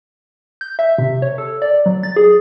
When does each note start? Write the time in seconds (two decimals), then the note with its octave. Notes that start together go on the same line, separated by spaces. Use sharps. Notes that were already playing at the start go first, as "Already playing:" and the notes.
0.61 G6
0.79 E5
0.98 C3
1.22 C#5
1.38 A4
1.62 D5
1.86 F#3
2.03 A6
2.16 G#4